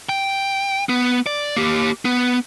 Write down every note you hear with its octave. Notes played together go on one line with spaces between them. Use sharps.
G5
B3
D5
A#3 G4
B3